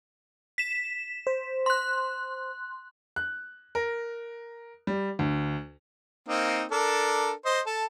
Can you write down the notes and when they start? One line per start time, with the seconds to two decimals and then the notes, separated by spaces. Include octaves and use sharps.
0.58 B6 E7
1.27 C5
1.66 C6 F#6
3.16 F#6
3.75 A#4
4.87 G3
5.19 D2
6.28 A#3 C4 D#4
6.71 D4 A4 A#4
7.45 C5 D#5
7.66 A4 A5